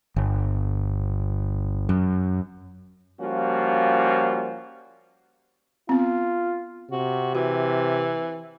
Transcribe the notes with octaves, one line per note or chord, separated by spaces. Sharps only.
G1
F#2
F3 G3 A#3 C#4 F4 F#4
B3 C4 F4
C3 F#4
E3 F#4